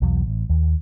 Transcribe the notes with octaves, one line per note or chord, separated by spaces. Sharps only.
B1 E2 F#3
A1
D#2